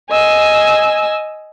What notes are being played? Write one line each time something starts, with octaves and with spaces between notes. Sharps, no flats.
D#5 G#5 E6